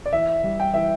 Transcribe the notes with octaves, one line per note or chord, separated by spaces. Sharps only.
D5
E3 E5
G3
G5
E3 E5